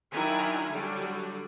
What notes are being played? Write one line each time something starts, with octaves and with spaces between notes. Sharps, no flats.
D#3 F#3 D4 E4 G#5 A#5
D3 F#3 G3